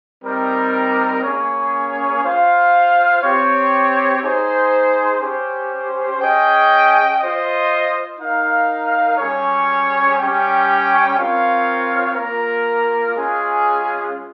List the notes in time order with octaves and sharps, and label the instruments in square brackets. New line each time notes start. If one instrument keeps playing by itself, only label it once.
[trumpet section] G3 C4 D#4 A#4
A#3 C#4 G#4 C#5
F4 C5 F5
C4 G4 C#5
D#4 G#4 C5
C#4 G4 C5
C#4 G#4 D#5 G5
F4 C5 D#5
D#4 A#4 F5
G3 C#4 G#4 C#5
G3 C#4 G4 C#5 G5
C4 F4 A#4 C#5 F5
A#3 F4 A#4
G#3 C#4 F4 G#4